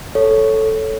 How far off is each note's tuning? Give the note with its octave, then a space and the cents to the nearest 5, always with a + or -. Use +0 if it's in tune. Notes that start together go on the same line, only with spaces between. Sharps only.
A4 +0 C#5 +0